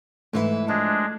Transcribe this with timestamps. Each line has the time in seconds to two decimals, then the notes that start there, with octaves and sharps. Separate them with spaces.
0.33 G#2 E3 A3 E4
0.68 F3 G#3 D4